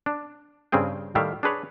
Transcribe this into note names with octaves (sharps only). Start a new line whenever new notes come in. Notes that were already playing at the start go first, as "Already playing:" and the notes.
D4
G2 C#3 C4 G#4 G5
A2 D#3 G3 E5 F5 G5
D4 G#4 B4 C#5